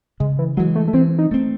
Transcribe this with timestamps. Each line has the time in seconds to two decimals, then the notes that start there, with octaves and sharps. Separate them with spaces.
0.20 C#3 G#3
0.39 E3
0.57 E3 F#3 G#3
0.75 A3
0.88 A3
0.93 E3 C4
1.18 D#4
1.31 A3 C4